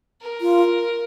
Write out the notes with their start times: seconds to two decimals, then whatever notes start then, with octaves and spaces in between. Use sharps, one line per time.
0.22 A#4
0.41 F4